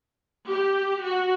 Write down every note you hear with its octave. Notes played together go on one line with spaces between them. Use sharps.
G4
F#4